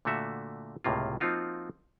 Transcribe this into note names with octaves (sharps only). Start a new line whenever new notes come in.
A#2 D3 A3 F#4 E5
C#2 A2 C3 A#3 F4
F3 A#3 C4 D#4 F4 F#4